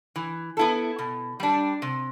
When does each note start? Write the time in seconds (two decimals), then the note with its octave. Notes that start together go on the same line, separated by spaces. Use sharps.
0.16 E3
0.57 B3 E4 A4
0.99 B2
1.40 G3 D4
1.82 C3